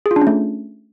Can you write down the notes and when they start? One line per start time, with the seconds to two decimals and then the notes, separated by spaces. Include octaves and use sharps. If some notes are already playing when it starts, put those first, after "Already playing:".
0.06 G#4
0.11 F4
0.16 D4
0.22 C#4
0.27 A3